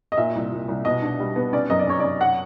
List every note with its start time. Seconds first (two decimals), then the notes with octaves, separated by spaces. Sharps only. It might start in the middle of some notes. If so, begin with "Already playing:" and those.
0.12 D#5
0.17 A#2 E5
0.35 C2
0.52 A#2
0.68 C2
0.85 B2 D#5
1.02 D4
1.19 G3
1.36 B3
1.53 C#4 D5
1.70 F#2 D#5
1.79 D5
1.87 C#4 C#5
2.00 D5
2.04 F#2
2.21 F#5